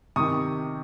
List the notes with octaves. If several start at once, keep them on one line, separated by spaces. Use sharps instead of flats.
C3 D#3 C#6 D#6